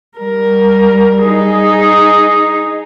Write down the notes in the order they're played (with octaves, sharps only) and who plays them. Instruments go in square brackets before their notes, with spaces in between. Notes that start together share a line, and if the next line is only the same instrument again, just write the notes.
[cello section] G3 [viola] A#4
[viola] D#4 G#4